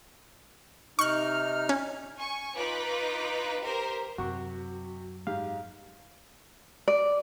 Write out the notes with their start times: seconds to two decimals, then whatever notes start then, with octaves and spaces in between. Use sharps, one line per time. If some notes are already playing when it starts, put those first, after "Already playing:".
0.99 C3 D#4 C#6 F6 F#6
1.69 C#4
2.16 G#5 C#6
2.57 D#4 F4 B4 D6
3.61 G4 A#4 C5
4.18 F#2 C3 F#4 C#6
5.27 G#2 G4 F5
6.88 D5